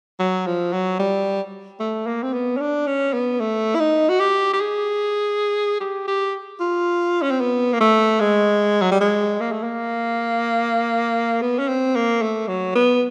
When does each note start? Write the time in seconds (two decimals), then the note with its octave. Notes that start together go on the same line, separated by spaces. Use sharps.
0.19 F#3
0.46 F3
0.73 F#3
0.99 G3
1.80 A3
2.07 A#3
2.23 C4
2.33 B3
2.56 C#4
2.60 D4
2.87 C#4
3.13 B3
3.40 A3
3.75 E4
3.80 D#4
4.09 F#4
4.20 G4
4.53 G4
4.61 G#4
5.80 G4
6.07 G4
6.60 F4
7.22 C#4
7.31 C4
7.41 B3
7.73 A#3
7.80 A3
8.20 G#3
8.81 F#3
8.91 G3
9.01 G#3
9.41 A#3
9.52 A3
9.63 A#3
11.42 B3
11.59 C#4
11.68 C4
11.95 A#3
12.22 A3
12.48 F#3
12.75 B3